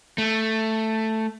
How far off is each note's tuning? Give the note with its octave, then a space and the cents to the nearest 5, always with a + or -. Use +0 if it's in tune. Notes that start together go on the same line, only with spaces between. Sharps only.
A3 +5